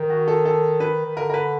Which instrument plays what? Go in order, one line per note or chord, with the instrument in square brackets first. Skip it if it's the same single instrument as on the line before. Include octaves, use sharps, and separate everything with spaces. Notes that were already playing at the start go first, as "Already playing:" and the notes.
Already playing: [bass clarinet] D#3
[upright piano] F#4
A4
A4
B4
[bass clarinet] D#3
[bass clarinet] D3 [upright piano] A#4
[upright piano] A#4
B4